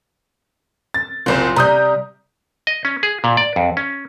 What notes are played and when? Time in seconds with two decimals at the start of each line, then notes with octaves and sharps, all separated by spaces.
0.94 A6
1.26 F#1 C2 C4 F4 C5
1.56 C3 G3 A#5 D#6 G6
2.67 D#5
2.85 C#4
3.03 G#4
3.24 A#2
3.37 D5
3.56 F2
3.77 C#4